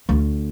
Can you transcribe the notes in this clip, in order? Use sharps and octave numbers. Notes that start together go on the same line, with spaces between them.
D2